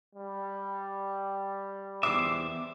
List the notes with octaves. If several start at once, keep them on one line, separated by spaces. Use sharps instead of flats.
G3
E2 C5 E5 D6